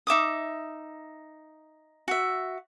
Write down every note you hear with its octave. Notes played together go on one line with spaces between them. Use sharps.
D#4 E5 D6 D#6
F#4 E5